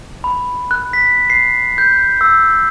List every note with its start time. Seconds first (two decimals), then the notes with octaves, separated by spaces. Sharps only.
0.24 B5
0.71 F#6
0.93 B6
1.30 C7
1.78 G6
2.21 E6